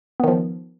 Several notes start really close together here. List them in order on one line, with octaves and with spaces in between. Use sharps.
B3 D#3 F3